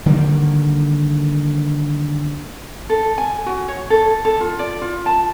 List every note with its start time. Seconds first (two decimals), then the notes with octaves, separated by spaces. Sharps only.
0.06 D3 D#3 G3 A#3
2.89 A4
3.18 G#5
3.46 F#4
3.68 C#5
3.90 A4
4.25 A4
4.41 F4
4.59 D5
4.81 F4
5.06 A5